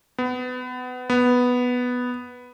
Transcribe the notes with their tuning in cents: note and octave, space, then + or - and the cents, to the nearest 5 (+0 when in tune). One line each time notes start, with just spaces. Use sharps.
B3 +25
B3 +0